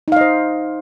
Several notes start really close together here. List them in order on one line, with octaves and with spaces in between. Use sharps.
D#4 F5 D#5 C5